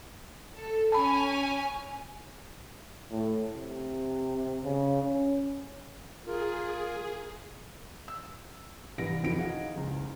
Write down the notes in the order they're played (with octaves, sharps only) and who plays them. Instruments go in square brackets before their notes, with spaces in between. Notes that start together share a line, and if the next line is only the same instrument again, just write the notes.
[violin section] A4
[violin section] C#4 G#5 [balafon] A5 B5
[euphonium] A2
C3
C#3
C#4
[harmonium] F4 A#4 [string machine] G#4
[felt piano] E6
C2 G2 E3 A#6 D7
F2 D#3 F#3 E4 D7
D#4 G#4 F5 F#5
F#1 C#2